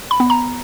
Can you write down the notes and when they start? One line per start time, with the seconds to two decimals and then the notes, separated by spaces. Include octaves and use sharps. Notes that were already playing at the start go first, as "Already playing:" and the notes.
0.11 B5
0.20 B3
0.30 A#5